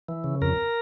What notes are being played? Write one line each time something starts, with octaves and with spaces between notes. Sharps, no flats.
E3
C#3
F2 A#4